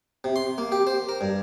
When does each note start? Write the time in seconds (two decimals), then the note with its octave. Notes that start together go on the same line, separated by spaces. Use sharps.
0.24 C3
0.36 C6
0.58 A#3
0.72 G4
0.87 C5
1.09 A#4
1.21 G2